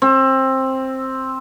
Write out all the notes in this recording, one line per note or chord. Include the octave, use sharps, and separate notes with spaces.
C4